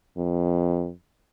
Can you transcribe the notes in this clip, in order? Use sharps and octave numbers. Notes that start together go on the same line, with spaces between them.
F2